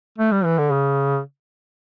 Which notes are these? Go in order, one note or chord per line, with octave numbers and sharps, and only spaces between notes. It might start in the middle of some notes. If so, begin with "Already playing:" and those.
A3
G3
E3
D3
C#3